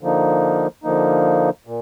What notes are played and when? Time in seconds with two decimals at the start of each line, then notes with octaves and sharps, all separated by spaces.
0.01 D3 F3 A#3 D#4
0.84 D3 F3 A#3 D#4
1.66 A#2